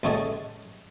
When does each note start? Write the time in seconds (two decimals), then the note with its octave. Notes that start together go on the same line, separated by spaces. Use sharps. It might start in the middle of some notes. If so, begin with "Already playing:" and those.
0.03 C#2 A3 C#5 D#5 A5